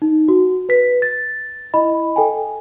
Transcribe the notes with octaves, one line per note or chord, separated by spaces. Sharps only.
D#4
F#4
B4 B6
A6
E4 D#5 B5
A4 G5 G#5